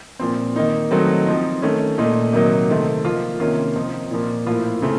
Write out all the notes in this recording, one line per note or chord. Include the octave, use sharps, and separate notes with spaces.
A#2 F3 C4
D#3 A#3 D#4
D#3 F#3 A3 C4 D#4
F3 C4 D#4
D#3 A3 C#4
A#2 A3 D#4
C3 D#3 F#3 A#3 D#4
C3 D#3 A3 C4
F3 A#3 F4
C3 D#3 A#3 C#4 F4
F3 C4 D#4
A#2 F3 A#3
A2 F3 A#3 F4
C#3 A3 C4